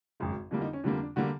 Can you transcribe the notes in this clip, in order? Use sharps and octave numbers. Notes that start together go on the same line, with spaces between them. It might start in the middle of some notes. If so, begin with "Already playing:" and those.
G#1 F#2 C#3
F2 D3 G3 A#3
D#4
C#4
F2 D3 G3 A#3 D4
D4
D3 G3 A#3 F#4